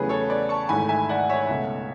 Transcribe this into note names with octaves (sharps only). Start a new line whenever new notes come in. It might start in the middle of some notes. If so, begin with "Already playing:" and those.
Already playing: E2 C#3 F#3 A3 G#4 B4
A4 C#5
B4 D5
A5 C#6
G#1 G#2 E3 A3 G#5 B5
E5 G#5
D5 F#5
C#5 E5
C#2 B2 A3